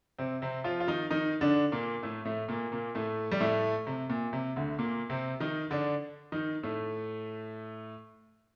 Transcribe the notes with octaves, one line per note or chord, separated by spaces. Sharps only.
C3 C4
C3 C4
F3 F4
F4
D#3 D#4
D#3 D#4
D3 D4
A#2 A#3
A2 A3
A2 A3
A#2 A#3
A#2 A#3
A2 A3
G3
A2 A3
C3
A#2
C3
D2 D3
A#2 A#3
C3 C4
D#3 D#4
D3 D4
D#3 D#4
A2 A3